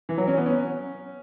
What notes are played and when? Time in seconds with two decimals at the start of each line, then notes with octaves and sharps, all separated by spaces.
0.09 E3
0.18 F#3
0.28 C#4
0.37 B3
0.46 C#4